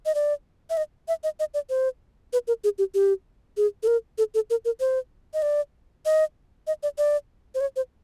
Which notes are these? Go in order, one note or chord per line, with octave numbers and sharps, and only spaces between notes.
D#5
D5
E5
D#5
E5
D#5
D#5
D5
C5
B4
A#4
G#4
G4
G4
G#4
A4
A#4
A4
A4
A#4
A#4
C5
D#5
D5
D#5
D#5
D5
D5
C5
C#5
C5